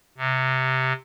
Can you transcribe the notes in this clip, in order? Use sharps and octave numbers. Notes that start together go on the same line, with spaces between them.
C3